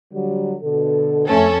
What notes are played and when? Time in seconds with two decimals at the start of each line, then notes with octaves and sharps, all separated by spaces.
0.14 D3 F#3 G3
0.63 B2 D3 A4
1.28 F2 A3 C#4 A4